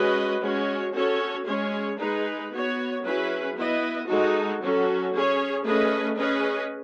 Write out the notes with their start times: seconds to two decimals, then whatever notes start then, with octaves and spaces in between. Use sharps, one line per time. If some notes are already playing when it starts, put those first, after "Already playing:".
Already playing: G#3 C#4 F#4 B4 D#5
0.42 G#3 C#4 F#4 C#5
0.94 C#4 F#4 A4 C#5
1.46 G#3 C#4 G#4 C#5
1.99 G#3 D#4 G#4 B4
2.51 B3 F#4 C#5
3.04 F#3 C#4 E4 G#4 B4
3.56 B3 E4 B4 D#5
4.08 G#3 D#4 F#4 A4
4.61 F#3 C#4 F#4 A4
5.13 C#4 G#4 C#5
5.66 A3 C#4 G#4 B4 D#5
6.18 C#4 G#4 B4 D#5